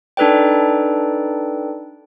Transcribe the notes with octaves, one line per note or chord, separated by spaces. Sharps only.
D4 D#4 A4 B4 D5 G5